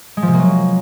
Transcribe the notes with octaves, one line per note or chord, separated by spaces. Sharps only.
G#3
F3
C3
A#3
F#3